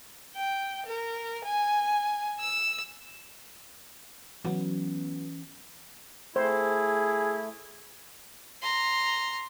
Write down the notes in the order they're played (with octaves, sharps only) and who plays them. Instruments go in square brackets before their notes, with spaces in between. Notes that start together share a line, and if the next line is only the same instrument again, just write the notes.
[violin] G5
A#4
G#5
E6
[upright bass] E3 C#4 [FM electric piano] F#3 B3
[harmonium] A3 [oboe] E4 [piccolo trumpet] G#4 [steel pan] C5
[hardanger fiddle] A#5 C6